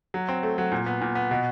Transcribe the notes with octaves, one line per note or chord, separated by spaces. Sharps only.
F#3
C4
A3
F#3
A#2
B3
A#2
B3
B2